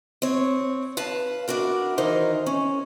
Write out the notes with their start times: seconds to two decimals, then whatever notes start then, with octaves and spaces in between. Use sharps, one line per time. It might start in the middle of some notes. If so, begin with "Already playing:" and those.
0.22 C4 C#5
0.97 B4 F5 A5
1.48 D4 E4 F#4 A#4
1.98 D#3 E3 D#4 A#4 C5
2.46 C#4